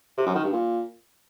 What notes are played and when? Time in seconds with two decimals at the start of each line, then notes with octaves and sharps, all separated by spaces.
0.18 C3
0.26 F#2
0.35 D#3
0.44 G2
0.53 A#2